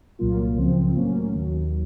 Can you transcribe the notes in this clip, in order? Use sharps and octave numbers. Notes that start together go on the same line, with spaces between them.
C2 A#2 F#3 A#3 F4
C#2 C#3 F3 C4
A2 F#3 A#3 C#4
D#2 D#3 F#3